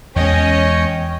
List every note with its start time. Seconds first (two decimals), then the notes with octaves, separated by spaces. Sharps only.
0.16 E2 G#3 C#4 C#5 D#5 G5 C#6